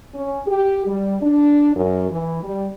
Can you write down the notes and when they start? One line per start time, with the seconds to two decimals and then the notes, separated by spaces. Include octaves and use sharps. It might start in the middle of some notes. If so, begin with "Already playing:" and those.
0.14 C#4
0.47 G4
0.86 G3
1.22 D4
1.76 F#2
2.11 E3
2.43 G3